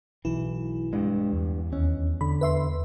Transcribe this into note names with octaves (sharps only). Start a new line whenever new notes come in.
B1 E3 E4
G2 G#3 D4
E2
D#2 C#4
D3 B5
B4 E5 C6